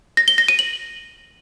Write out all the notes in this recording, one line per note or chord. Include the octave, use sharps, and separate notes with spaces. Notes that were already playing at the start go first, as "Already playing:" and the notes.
A#6
G7
A#6
D#7
F#7